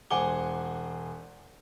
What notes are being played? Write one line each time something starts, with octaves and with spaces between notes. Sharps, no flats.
E1 C5 F#5 G#5 D6 G7